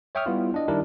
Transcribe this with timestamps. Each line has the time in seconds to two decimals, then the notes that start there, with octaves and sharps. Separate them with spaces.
0.15 C#5 E5 G5 C#6 D#6 F6
0.26 G3 B3 E4 F4
0.54 D4 D#5
0.68 D#3 G3 D4 E4 G4 A#4